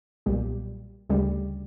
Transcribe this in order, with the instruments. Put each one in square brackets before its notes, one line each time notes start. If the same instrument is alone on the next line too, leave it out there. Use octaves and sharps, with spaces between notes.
[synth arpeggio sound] B1 A#2 G3
D2 C#3 G3